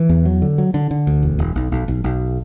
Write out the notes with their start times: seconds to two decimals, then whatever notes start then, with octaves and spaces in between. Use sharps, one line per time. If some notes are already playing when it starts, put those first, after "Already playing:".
Already playing: E3
0.09 E2
0.25 F#3
0.42 D3
0.58 F#3
0.74 D3
0.91 D3
1.07 D2
1.23 E1
1.39 E1
1.56 B1
1.72 B1
1.88 B1
2.04 B1